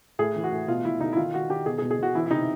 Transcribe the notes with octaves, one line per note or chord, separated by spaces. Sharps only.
A2 G#4
E3
F#4
A2
B2 F4
B2 E4
B2 D#4
E4
D#3 F4
D#3 F#4
D#3 G4
B2 G#4
G#4
B2
G#4
B2 F#4
E3 E4
E4
C3 D#4